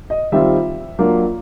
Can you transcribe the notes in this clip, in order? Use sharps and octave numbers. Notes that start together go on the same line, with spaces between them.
D#5
D#3 G3 C4 F4 E5
F#3 A#3 D4 F4